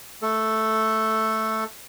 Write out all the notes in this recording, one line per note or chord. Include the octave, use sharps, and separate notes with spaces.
A3 A4